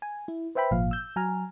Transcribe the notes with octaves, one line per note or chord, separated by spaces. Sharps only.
G#5
E4
B4 C5 E5 G5 B5
G#1 A#2 F3 F5
E6 G6
F#3 G#5 A#5 F6